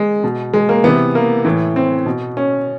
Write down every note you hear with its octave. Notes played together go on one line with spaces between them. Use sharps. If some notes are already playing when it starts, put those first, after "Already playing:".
Already playing: G#3
B2
G#3
A#3
C3 E3 B3
A#3
A2 E3
C4
B2
C#4